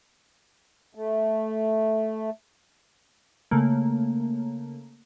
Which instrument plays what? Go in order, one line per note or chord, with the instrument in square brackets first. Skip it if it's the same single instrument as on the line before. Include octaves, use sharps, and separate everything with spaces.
[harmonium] A3
[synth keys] C#3 A3 A#3